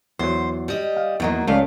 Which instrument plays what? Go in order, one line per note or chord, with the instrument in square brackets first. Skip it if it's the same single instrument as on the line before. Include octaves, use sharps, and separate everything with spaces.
[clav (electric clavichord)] E2 F#3 [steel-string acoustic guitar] C5
[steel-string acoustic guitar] G3 D#5
[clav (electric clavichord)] F5
[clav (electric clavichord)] E2 [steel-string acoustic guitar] D#3 F#3 A#3
[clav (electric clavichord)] C#2 C#4 D5 [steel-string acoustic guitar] C#3 A3 F5